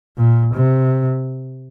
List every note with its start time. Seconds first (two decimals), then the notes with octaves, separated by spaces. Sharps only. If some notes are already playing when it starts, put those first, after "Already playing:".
0.18 A#2
0.54 C3